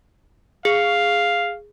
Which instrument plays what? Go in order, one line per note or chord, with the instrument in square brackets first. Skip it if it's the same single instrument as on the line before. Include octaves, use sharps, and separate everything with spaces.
[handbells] G#4 [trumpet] F5